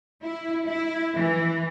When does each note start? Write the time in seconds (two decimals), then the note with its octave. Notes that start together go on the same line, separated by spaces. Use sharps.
0.23 E4
0.68 E4
1.17 E3